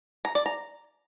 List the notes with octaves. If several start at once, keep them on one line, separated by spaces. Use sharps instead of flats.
A#5
D5
A#5